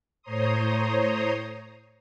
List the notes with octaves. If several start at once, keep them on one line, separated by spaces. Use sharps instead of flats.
A2 C5 C#5 A#5 C6 D#6